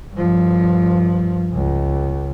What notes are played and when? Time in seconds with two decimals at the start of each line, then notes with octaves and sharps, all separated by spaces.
0.13 G2 F3
1.53 C#2